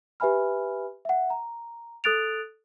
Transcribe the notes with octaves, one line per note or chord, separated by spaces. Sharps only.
G4 B4 E5 G#5 B5 F6
E5 F#5
A#5
A4 D#6 F#6 A6 D7 F7